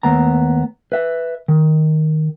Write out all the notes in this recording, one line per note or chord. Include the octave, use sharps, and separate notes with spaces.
D#2 A3 B3 A#5
B4 E5
D#3